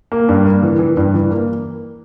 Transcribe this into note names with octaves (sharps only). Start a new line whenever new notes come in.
A#3
G2
A#3
E3
E3
G2
E3
A#3